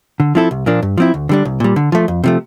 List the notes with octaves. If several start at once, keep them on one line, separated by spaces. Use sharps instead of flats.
D3
F3 C4 E4 A4
C2
A#2 F3 A#3 D4
G2
F3 C4 E4
D2
D3 G3 D4
C2
A#2 G3
D3
F3 A3
F2
C3 F3 A3